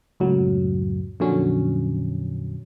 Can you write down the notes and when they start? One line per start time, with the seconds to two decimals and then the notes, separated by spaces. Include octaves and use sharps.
0.20 C#2 F#2 A2 F#3
1.20 F2 A#2 D3 F#3 C#4